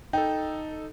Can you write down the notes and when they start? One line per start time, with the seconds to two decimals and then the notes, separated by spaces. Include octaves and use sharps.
0.13 D#4 A4 G5